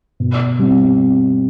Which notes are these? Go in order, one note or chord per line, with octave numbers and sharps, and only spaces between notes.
B2
G3 C4